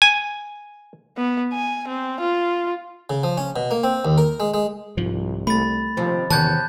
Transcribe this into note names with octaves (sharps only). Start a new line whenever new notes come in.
G#5
B3
G#5
C4
F4
C#3
F3
C#4
B2
A#3
C4
D#2
A#4
G#3
G#3
C2 G#2 F3
A3 B5 A6
D#2 C3 F3 C4
E2 C3 D#3 C#4 A5 F#6 G6